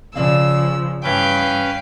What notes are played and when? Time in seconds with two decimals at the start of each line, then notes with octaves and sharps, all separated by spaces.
0.15 C#3 F3 D4 D5 F5 E6
1.04 G2 E3 A3 C#4 B4 F5 G5